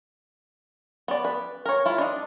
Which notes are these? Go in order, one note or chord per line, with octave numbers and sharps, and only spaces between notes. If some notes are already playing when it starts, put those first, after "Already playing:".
B3 D5
B4
A#4 C#5
E4 F4
D4 D#4